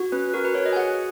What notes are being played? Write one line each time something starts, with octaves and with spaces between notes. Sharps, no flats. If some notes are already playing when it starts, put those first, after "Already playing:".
Already playing: F#4
C#4 B4
F#4 A#4
B4
F#4 C#5
D#5
G#5
G#4 F#5